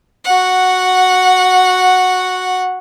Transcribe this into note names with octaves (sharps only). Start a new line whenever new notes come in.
F#4 F#5